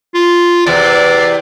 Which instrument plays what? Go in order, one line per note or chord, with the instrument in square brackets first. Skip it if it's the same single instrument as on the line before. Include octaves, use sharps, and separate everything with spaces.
[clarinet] F4
[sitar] E2 C3 [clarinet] D5